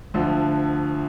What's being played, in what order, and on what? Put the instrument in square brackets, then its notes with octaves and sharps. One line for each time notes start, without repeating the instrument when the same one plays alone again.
[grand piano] D2 D3 F3